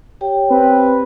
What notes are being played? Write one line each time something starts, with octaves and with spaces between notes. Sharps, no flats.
G4 C#5 G5
C4 B4